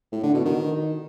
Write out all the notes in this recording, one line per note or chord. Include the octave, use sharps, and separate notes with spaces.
A2
D3
B2
D#3